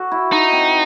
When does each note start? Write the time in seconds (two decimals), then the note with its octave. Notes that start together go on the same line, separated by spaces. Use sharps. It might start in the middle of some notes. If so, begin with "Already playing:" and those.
Already playing: F#4 A4
0.11 E4
0.32 D#4
0.53 C4